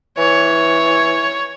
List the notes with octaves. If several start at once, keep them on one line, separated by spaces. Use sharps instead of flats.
E3 C#5